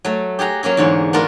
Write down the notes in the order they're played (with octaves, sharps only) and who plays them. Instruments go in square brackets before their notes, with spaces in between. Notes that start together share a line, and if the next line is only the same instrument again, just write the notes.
[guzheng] F#3 A3
G4 G#4 F#5 A#5
F#3 A#3 C#4 G#4
E2 G#2 D3 C#5
A3 B3 D4 F4 F#4 A#4